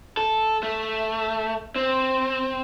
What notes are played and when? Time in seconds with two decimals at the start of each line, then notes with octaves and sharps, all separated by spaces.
0.17 A4
0.63 A3
1.76 C4